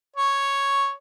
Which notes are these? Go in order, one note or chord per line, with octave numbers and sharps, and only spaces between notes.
C#5